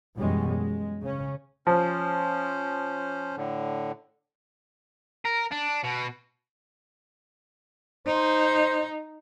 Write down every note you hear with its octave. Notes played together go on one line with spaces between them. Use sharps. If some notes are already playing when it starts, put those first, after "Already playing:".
F#2 B2 E3 G3 G#3 C#4
G#3
C#3 C#4
F3 C#4 C5
A2 D3
A#4
D4
B2
D#4 C5